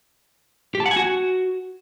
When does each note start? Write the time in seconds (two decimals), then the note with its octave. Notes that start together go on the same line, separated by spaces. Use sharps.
0.75 G4
0.80 A5
0.86 F#5
0.91 G#5
0.96 F#4